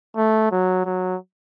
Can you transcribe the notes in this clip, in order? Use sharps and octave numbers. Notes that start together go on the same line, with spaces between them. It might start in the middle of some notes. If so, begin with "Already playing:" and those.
A3
F#3
F#3